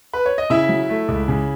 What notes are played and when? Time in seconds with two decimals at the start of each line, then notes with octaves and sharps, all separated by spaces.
0.13 B4
0.26 C#5
0.38 D#5
0.50 C#3 E4 E5
0.69 F#3
0.90 A3
1.08 C#2
1.28 C#3